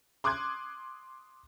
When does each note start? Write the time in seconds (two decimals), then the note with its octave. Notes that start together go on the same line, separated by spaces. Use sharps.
0.24 C6 D6 D#6 F#6 G#6